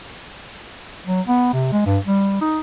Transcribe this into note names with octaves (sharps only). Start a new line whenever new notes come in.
F#3
B3
C3
G#3
G2
G3
D#4